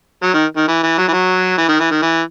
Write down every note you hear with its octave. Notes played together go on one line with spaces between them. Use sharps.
F#3
D#3
D#3
E3
E3
F#3
E3
F#3
E3
D#3
E3
D#3
E3